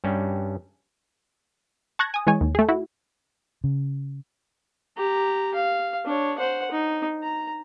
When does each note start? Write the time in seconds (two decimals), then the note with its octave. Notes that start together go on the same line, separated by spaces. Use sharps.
0.04 G2 G3 C#4
1.99 A5 C#6 F#6 G#6 A#6
2.14 G#5 D#6
2.27 E3 G#3 C#5 G#5
2.41 D#2
2.55 A3 G#4
2.69 E4 F#4
3.64 C#3
4.97 G4 A#5
5.55 F5
6.05 D4 C#5
6.39 C5 F#5
6.71 D#4
7.23 A#5